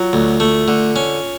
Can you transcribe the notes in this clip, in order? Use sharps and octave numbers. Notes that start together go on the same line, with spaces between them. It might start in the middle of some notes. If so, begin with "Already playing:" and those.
Already playing: F#3 F4
D2
A3
D3
C#4